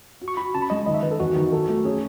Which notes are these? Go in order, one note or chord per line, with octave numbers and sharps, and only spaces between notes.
F#4
C#6
F#4 B5
C#3 A5
B5
G#3 D#5
D#3 D#5
E5
D#3 B4
A4
E2 F#4
D#3
A4
A3
C#4 G#4